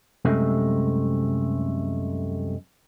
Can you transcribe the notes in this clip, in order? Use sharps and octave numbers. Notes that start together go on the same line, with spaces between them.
C2 F#2 C3 G#3 A3